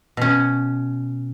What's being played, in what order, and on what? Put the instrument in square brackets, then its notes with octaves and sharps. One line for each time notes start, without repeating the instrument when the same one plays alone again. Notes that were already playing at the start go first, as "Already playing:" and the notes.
[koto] B2 C#4